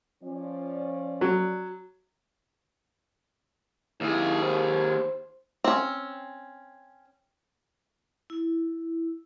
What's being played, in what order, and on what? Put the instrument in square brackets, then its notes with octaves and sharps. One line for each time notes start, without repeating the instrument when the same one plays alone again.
[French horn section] F3 C#4 D5
[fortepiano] F#3
[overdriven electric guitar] D#2 G#4 [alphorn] E4
[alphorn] C5
[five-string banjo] C4 C#4
[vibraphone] E4